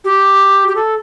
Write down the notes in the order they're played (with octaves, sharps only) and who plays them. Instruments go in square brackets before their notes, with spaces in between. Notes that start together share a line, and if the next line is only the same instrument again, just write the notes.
[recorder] G4
G4
A4